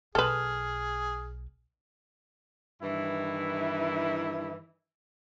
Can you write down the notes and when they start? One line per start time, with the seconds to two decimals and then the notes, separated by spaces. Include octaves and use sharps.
0.15 B1 G#4 A4 B4 F6
2.82 G2 D#3 E3 E4